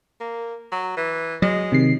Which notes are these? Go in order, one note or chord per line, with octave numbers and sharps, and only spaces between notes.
A#3
F#3
E3
F#3 G#3
C3 D#3 C7